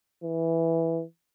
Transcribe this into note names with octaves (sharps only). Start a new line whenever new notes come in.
E3